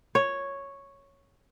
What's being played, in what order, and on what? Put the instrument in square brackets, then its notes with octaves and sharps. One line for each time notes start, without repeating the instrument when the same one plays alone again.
[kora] C#5